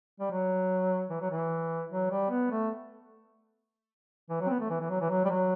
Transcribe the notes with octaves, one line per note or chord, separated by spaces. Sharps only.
G3
F#3
E3
F#3
E3
F#3
G3
B3
A3
E3
F#3
C4
B3
A3
E3
E3
F#3
E3
F#3
G3
F#3